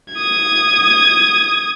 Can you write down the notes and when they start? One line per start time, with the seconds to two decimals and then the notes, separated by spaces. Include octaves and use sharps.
0.14 D#6 G#6